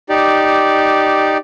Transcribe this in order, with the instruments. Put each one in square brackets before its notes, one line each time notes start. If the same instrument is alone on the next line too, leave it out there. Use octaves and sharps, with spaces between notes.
[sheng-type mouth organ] D#4 G4 D5